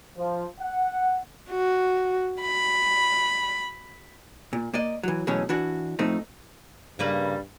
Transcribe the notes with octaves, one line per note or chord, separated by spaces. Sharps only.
F3
F#5
F#4
B5
A#2
A#3 D5 D#5
E3 F#3
B2 E3 F#3 A3 C#4 G#4
E3 D4 F#4
A2 F3 A3 C4 D#4
G2 C#3 G3 A#3 B4